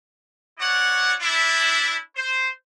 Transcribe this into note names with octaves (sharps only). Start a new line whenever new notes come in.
E4 F#4 C#5 D5 F#5
D4 E4
C5